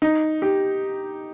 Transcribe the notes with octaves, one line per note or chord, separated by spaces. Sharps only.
D#4
G4